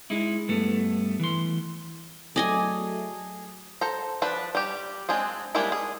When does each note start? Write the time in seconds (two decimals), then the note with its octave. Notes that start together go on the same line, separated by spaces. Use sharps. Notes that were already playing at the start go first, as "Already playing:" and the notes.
0.10 G#3 D#4 E4
0.48 G2 A3 B3
1.20 E3 C6
2.36 F#3 A3 G#4 D5 D#5 G#5
3.81 A4 C5 A#5
4.22 F3 D4 B4
4.55 G3 G4
5.09 G#3 C4 D4 G#4
5.55 G3 G#3 A#3 D4 E4
5.72 G#4